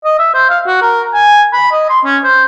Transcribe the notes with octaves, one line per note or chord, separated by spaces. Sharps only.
D#5
E5
C5
F5
F#4
A#4
G#5
B5
D#5
C6
C#4
C5